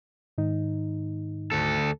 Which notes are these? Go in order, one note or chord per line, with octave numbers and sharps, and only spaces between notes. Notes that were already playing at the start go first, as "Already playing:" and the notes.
G#2 D#3 D#4
D2 A4